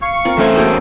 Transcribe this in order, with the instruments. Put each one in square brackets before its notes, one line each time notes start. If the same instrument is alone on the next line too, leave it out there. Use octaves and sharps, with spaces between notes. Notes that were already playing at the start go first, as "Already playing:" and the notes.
[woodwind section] F5 C#6
[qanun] C4 F4 A#4
[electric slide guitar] E2 C#4 C5 [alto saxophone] A3 [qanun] E5 G#5
[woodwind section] F#2 G#4 G5 [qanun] A#3 F#4 A4